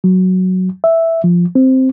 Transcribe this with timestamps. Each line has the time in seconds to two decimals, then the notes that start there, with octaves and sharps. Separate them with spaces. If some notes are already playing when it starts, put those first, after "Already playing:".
0.04 F#3
0.84 E5
1.24 F3
1.55 C4